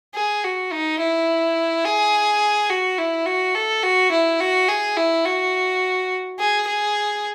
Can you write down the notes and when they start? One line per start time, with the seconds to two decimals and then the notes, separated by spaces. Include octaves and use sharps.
0.15 G#4
0.44 F#4
0.72 D#4
1.00 E4
1.85 G#4
2.70 F#4
2.99 E4
3.27 F#4
3.55 A4
3.84 F#4
4.12 E4
4.40 F#4
4.69 G#4
4.97 E4
5.26 F#4
6.39 G#4
6.67 G#4